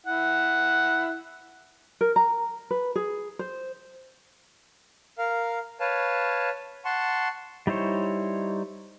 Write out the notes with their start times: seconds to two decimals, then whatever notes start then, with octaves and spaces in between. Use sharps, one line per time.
0.06 E4 F#5
2.01 A#4
2.16 A#5
2.71 B4
2.96 G#4
3.39 C5
5.18 A#4 F5
5.80 B4 C#5 F5 A5
6.85 F#5 A5 C6 C#6
7.67 G3 D#4 E4 C5 C#5